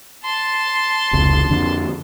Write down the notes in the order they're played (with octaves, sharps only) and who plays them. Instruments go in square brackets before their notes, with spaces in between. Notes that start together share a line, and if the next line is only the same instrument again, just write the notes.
[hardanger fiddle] A5 C6
[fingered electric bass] F1 C#2
F2 D3